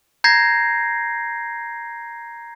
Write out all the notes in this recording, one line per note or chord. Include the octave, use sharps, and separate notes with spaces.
A#5 G6 G#6 A#6 C7